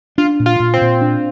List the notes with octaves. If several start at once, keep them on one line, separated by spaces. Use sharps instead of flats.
D4 F4
A#2
F4
A#2
C4
A#2
D4